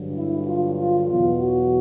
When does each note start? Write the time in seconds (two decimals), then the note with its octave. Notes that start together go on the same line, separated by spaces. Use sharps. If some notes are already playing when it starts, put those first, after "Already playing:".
Already playing: G2 D3 F#3
0.15 E4
0.45 F4
0.77 F4
1.07 E2 B2 F#3 F4
1.39 F#4